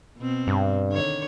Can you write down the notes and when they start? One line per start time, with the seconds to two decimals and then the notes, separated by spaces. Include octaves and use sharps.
0.18 B2 C4
0.47 G2
0.89 D3 D#3 C#5